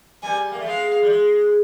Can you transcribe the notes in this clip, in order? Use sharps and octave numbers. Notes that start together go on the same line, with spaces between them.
G3 G#5
A#3
A3
G#3 F5
G3
G#3